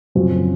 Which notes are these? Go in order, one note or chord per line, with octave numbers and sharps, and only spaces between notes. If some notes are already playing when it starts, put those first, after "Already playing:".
F#1 F#2 F3 C4 F#4